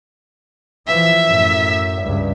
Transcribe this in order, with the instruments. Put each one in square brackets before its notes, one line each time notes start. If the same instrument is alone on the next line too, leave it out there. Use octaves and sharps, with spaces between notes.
[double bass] E3 F3 [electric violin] E5
[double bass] F#2 A2
C#2 G2